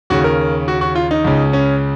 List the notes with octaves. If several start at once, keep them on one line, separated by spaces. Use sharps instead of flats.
D#2 C#3 F#4
A#4
F#4
F#4
F4
D#4
C#2 C#3
C#4